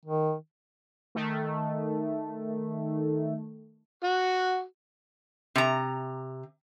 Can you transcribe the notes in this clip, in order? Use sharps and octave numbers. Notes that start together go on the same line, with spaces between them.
D#3
D#3 A3
F#4
C3 A#5